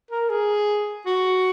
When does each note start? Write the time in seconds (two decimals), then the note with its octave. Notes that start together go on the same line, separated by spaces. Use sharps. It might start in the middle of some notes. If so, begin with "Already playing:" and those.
0.11 A#4
0.30 G#4
1.06 F#4